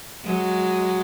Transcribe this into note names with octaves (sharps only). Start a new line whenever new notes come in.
F#3 G#3